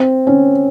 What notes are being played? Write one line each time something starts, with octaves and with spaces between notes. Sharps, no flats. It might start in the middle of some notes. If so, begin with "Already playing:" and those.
Already playing: C4
C#4